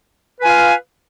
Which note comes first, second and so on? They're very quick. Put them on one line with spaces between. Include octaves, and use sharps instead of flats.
B4 G#5 F4 F5